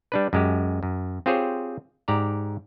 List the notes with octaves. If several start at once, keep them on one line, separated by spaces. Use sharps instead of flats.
G3 D4 B4
F#2 G#3 G4
F#2
C4 F4 G4 G#4 C5 C#5
G#2 G4 D5 A#5